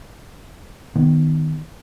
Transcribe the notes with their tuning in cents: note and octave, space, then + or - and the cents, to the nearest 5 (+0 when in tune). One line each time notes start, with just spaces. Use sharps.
D#3 +0 B3 +0